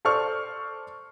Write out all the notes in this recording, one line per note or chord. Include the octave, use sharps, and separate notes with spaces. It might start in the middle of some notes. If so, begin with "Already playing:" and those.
A4 C5 D5 C#6 F6